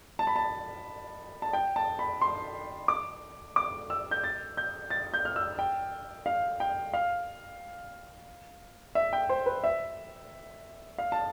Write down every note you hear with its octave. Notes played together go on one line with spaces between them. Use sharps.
A5
B5
A5
A5
G5
A5
B5
C6
D6
D6
E6
G6
A6
G6
A6
G6
F6
E6
G5
F5
G5
F5
E5
G5
C5
B4
E5
F5
A5